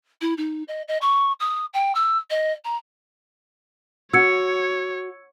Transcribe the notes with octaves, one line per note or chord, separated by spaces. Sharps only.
E4
D#4
D#5
D#5
C#6
D#6
G5
E6
D#5
A#5
F#4 C#5 E6 G#6 C#7